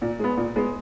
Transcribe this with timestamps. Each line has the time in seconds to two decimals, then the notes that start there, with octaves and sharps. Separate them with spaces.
0.02 A#2
0.19 G#3 B3
0.37 A#2
0.56 G#3 B3